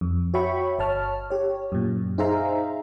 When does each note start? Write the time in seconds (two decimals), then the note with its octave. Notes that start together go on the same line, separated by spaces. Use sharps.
0.01 F2
0.34 F#4 C#5 E5 G5 B5 C#6
0.79 G1 C#5 A5 F6
1.30 G4 C#5
1.72 F#2 A#2
2.18 D#4 G#4 C5 E5 F5 A#5